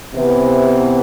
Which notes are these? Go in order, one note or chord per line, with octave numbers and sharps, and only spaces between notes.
C3 E3 B3